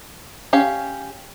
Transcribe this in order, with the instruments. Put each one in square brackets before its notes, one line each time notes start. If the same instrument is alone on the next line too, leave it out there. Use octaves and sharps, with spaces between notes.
[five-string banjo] C#4 G4 F5